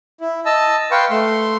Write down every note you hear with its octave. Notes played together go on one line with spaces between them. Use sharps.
E4
D#5 A5 E6
B4 F5 G5 C6 C#6
A3 C6